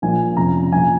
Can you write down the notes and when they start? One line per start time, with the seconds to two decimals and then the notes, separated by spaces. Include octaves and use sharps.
0.02 A#1 A#2 F3 G#5
0.37 F1 F2 C#3 A#5
0.72 A#1 A#2 F3 G#5